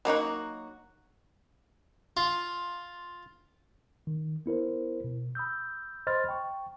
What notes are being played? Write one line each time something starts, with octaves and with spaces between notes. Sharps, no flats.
F#3 A#3 D#4 F#4
F4
D#3
B3 E4 A#4 C5
B2
B5 D#6 E6 G6
C5 D#5 B5 C6 F6 A6
G5 C#6